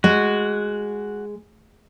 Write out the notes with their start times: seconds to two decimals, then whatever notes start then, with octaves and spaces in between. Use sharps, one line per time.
0.04 G#3 F#4